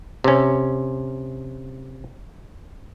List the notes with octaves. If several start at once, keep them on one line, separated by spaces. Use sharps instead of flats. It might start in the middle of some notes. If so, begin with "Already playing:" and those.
C3 C#4